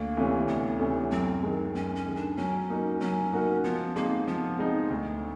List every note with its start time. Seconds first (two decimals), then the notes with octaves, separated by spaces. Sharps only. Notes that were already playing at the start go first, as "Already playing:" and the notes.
Already playing: D2 A#3
0.17 C3 E3 A3 C#4
0.47 D2 B3
0.80 C3 E3 A3 C#4
1.11 F#2 C4
1.43 D#3 G#3
1.74 F#2 C#4
1.95 C#4
2.06 D#3 G#3
2.16 D4
2.37 F#3 C#4
2.69 A#3 D#4 F#4 A#4
3.00 F#3 C#4
3.33 A#3 D#4 F#4 A#4
3.64 F3 B3
3.96 G#3 A#3 C4 D#4
4.27 F3 B3
4.59 G#3 C4 D#4
4.90 D2